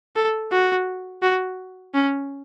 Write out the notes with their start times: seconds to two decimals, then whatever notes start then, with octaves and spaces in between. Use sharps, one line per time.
0.16 A4
0.52 F#4
1.22 F#4
1.94 C#4